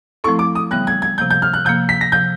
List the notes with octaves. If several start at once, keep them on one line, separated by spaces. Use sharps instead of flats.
F3 A3 C4 E4 A4 C#6
D6
D#6
C#3 E3 G3 B3 F#6
G#6
G#6
C3 F3 A#3 G6
G6
F6
F#6
C3 F3 A#3 G6
B6
A#6
C3 F3 G6